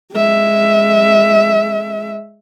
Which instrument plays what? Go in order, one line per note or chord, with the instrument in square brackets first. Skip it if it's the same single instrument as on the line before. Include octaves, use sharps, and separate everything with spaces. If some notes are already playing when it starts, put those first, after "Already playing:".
[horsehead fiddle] G#3 E5